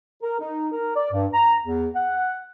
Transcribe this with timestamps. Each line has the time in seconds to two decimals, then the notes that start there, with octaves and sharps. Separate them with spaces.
0.23 A#4
0.40 D#4
0.72 A#4
0.95 D5
1.11 G2
1.34 A#5
1.63 E2
1.95 F#5